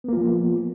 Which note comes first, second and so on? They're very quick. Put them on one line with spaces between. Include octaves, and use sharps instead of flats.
B3 A#3 F4 F3